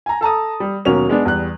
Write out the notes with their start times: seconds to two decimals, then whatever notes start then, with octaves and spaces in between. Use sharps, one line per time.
0.06 G#5 A#5
0.21 A4 A5 A#5 D#6
0.60 G3
0.85 D#2 B2 F#3 C#4 A#4 F7
1.09 G#3 B3 D4
1.25 E2 G3 F#6